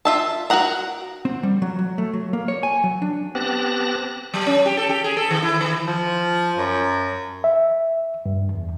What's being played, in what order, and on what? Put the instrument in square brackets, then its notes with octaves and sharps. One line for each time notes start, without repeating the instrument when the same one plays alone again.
[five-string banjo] F4 E5 A5
F#4 G#4 A#4 F#5 A#5
[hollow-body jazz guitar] C4
G3
F#3
F#3
A3
F#3
A#3
C#5
G#5
F#3
D4
[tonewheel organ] B3 C4 G4 A5 F#6 A#6
[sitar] F#3
C#4
G4
A4
G4
G#4
A4
D#3
E4
D#3
[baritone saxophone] F3
F#2
[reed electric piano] E5
G2
E2